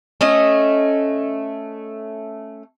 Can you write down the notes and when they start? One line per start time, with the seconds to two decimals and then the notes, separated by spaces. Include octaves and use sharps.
0.21 A3 C#4 D#5